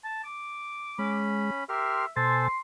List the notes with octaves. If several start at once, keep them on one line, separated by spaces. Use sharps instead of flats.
A5
D6
G#3 C#4 B5
G4 A#4 E5 C6 F6
B2 A4 C5 G#5 C6 A6